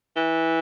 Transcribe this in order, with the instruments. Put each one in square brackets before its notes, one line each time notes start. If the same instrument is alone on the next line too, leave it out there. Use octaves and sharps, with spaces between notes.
[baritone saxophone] E3